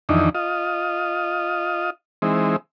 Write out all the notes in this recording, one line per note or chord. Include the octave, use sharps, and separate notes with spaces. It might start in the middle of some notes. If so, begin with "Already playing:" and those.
F2 D#3 E3 D4 D#4
F4 D#5
E3 G#3 C4 D#4